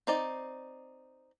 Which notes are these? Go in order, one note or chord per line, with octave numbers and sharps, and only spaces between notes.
C4 D#4 D5